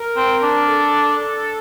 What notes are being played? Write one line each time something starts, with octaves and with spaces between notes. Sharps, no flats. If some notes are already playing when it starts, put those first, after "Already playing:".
Already playing: A#4
C4
D4
A4